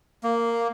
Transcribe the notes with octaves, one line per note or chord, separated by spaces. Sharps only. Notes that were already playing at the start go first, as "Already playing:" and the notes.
A#3